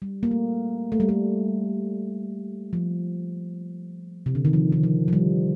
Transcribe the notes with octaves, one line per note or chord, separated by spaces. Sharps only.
G3
A#3
A3
A3
G3
A3
F3
C3
D3
D#3
F3
D#3
F3
F3
G3